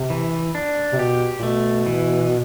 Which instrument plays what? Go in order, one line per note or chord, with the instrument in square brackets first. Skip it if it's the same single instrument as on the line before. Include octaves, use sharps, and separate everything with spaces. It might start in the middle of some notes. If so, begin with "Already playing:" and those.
Already playing: [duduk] C3
[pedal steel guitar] E3
D4
[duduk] C3
[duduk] B2 [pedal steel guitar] G4
[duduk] A#2
[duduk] B2 [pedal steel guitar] A3
[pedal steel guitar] E3